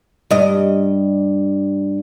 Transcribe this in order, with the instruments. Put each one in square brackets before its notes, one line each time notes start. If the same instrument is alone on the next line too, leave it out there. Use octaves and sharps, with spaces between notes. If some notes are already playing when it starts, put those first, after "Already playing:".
[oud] G2 D#5